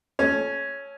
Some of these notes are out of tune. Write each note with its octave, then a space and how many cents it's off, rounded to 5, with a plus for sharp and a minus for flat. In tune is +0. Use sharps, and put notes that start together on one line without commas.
C#4 +0 A4 -30